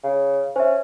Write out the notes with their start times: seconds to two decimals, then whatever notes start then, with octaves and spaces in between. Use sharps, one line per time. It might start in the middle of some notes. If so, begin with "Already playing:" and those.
0.04 C#3
0.56 C#4 C5 E5